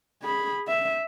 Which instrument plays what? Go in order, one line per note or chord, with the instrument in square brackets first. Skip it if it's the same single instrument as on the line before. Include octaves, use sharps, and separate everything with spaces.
[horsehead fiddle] G#4 B5
E5